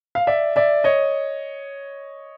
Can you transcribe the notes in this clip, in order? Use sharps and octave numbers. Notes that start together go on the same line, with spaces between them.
F5
D5 E5
D5 E5
C#5 D#5